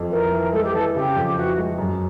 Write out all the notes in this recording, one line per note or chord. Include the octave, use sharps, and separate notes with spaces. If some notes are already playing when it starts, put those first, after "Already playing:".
Already playing: F2
E3 A#4
E3
G#3 A4
G4
E3 A4
C#3 G4
F2
E3 F#4
G#3
F#2